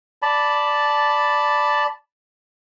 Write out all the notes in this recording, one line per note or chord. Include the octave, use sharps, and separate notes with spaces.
D5 A5 B5